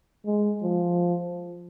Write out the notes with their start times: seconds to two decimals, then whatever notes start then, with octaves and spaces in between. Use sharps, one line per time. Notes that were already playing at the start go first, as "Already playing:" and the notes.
0.26 G#3
0.63 F3